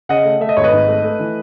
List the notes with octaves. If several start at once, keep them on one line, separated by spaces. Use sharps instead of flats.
C#3 D#5 F#5
A3
A3 E5
D#5
G#1 C#5
B4 D#5
G#2
A3
A3
E3